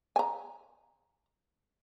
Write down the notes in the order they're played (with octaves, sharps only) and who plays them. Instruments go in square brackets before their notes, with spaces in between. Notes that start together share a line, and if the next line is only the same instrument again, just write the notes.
[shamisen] G#5 A#5